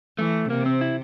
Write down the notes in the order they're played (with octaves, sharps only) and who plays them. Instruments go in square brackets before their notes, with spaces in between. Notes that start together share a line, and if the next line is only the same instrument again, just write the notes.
[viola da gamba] E3 [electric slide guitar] A3
[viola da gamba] C3 [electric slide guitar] A#3
[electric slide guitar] C4
E4